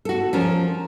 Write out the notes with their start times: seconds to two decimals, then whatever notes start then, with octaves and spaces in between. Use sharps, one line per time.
0.05 F#4 A4
0.33 F3 C#4 A#4